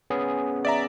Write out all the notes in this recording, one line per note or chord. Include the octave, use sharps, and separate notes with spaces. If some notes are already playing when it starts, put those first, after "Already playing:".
B3 C#4 G#4
D5 E5 A#5